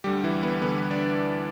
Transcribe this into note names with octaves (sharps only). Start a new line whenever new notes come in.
D2 D3 G3 G4
E3 E4
B3 B4
D2 D3 G3 B3 B4
D4 D5